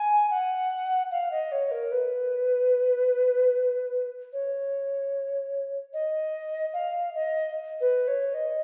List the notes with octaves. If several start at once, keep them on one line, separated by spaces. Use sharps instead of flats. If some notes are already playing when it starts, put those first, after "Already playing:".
Already playing: G#5
F#5
F5
D#5
C#5
A#4
B4
C#5
D#5
F5
D#5
B4
C#5
D#5